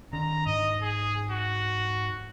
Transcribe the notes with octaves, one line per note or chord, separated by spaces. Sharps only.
D#3 D4 A#5
G#2 D#5
G#4
F#4